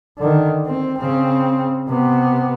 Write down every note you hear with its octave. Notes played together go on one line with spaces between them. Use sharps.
D3 D#3
C4
C#3 C4
C3 B3